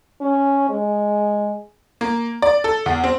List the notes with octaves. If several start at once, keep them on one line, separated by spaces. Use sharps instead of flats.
C#4
G#3
A#3
D5
A4
E2
C4